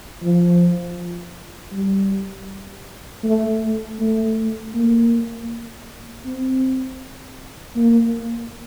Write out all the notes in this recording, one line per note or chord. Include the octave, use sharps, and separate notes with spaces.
F3
G3
A3
A3
A#3
C4
A#3